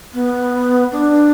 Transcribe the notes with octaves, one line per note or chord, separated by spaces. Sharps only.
B3
D4